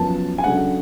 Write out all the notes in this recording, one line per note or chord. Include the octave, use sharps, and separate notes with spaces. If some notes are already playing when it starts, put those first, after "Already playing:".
Already playing: F#2 F3 B3 A5
G#5
C#3 F#3 A3 D4 F#5